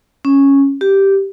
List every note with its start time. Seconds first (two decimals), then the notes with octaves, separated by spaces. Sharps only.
0.25 C#4
0.81 G4